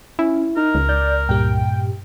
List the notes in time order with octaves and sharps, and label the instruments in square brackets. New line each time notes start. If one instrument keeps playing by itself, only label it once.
[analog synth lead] C#4 [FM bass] E4
[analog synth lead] D#4 [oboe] A#4
[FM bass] C#2
[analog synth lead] D5 [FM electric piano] G6
[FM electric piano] G2 A#2 G4 [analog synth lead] G5